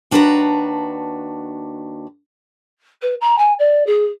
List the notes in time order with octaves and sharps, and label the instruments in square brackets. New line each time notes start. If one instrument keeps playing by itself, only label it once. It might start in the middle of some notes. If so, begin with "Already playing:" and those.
[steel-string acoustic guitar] D#2 D4 F#4 B4 A5 A#5
[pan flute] B4
A#5
G#5
D5
G#4